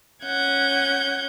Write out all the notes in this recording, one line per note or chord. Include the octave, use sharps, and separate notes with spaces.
C#4 F#5 G6 G#6